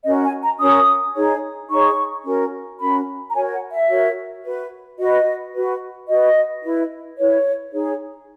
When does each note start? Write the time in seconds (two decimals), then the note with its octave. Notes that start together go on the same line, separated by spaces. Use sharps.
0.06 C#4 F#4 A#4 D#5
0.24 G#5
0.43 A#5
0.60 C#4 F#4 A#4 D#6
1.15 D#4 G#4 C#5
1.70 D#4 G#4 C#5 C#6
2.25 C#4 F#4 A#4
2.80 C#4 F#4 A#4 B5
3.30 A#5
3.35 F#4 A#4 C#5 G#5
3.53 F#5
3.71 E5
3.90 F#4 A#4 C#5
4.44 F#4 B4
4.99 F#4 B4 D#5
5.54 F#4 B4
6.08 F#4 B4 D#5
6.64 E4 B4
7.19 E4 B4 C#5
7.73 D#4 G#4 C#5